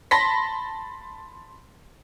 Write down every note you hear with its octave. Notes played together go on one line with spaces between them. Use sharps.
A5 B5 C6 A#6 B6